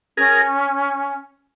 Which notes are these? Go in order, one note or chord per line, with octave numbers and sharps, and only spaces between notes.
C#4 G#4 A#4